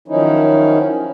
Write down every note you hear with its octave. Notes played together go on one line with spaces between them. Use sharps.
D#3 F3 F#3 C#4 D#4 E4